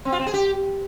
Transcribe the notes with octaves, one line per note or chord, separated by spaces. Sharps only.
C4
F4
C4
G#4
G4